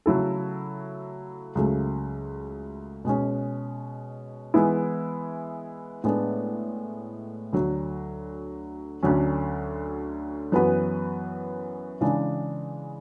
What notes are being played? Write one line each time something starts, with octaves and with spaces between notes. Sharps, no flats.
C#3 F#3 A3 E4 A4
C#2 C#3 F#3 A3
B2 G#3 C#4
E3 G#3 B3 E4
A2 G#3 B3 D4
D2 D3 F#3
D2 D3 F#3 C#4
F#2 E3 B3 F#4 B4
C#3 E3 G#3 D4